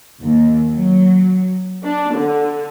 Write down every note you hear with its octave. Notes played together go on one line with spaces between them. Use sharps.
D#2
F#3
D4
D3